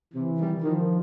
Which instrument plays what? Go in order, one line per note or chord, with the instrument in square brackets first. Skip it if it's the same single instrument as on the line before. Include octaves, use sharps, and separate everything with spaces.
[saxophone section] C3 [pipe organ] E3
[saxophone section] D#3 G3
[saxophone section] D#3 [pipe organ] F3